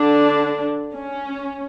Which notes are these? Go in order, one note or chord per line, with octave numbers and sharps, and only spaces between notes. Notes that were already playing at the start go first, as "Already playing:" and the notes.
Already playing: D3 D4
C#4